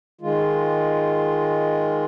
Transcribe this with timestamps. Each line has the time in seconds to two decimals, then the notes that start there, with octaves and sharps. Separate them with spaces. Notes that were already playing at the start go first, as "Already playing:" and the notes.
0.21 D#3 G#3 F4